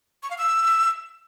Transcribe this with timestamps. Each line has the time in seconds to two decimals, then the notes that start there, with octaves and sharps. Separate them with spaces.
0.23 C#6
0.30 F5
0.38 E6